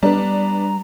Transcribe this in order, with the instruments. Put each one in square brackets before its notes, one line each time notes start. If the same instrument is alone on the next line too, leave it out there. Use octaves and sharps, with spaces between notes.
[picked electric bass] G3 [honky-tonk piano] B3 D4 [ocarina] A#5